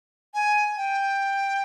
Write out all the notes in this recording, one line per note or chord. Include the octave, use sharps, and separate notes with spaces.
G#5
G5